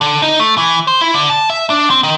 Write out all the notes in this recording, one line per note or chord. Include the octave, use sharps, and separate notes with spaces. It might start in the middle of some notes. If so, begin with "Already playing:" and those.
D3
D#4
A3
E3
C5
E4
D3
A5
E5
D4
C4
D#3